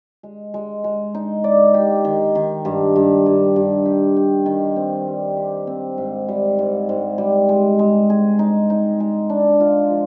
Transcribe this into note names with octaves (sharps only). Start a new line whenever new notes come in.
G#3
G#3
G#3
D#4
D5
G4
D#3
D#3
G2
G2
G2
G2
G4
G4
D#3
C4
G3
G4
C4
G#2
G3
G#2
G#2
G3
G#3
G#3
G#4
D#4
D#4
G#3
D4
F4
F3